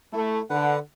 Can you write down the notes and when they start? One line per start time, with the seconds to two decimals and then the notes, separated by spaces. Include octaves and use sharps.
0.13 A3 E4
0.50 D3 B4 F#5